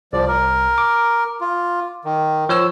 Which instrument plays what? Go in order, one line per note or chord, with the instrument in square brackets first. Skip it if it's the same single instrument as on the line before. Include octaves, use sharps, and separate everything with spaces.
[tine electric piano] C2 [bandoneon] F3 D5
[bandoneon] A#4
[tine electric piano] D6
[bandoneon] F4
D#3
[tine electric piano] F3 C#5 E6